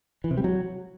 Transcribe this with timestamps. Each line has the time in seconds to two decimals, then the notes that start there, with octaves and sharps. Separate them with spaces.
0.24 E3
0.31 C3
0.37 G3
0.44 F#3